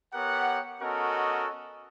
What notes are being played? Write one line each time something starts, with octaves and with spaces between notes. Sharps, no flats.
B3 G4 A#4 C#5 F#5
B3 C#4 F#4 A4 A#4 D#5